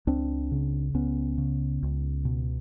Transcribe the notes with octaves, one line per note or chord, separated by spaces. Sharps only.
C#2 C4 D4
C#3
C#2 B3 C#4
C#3
C#2
B2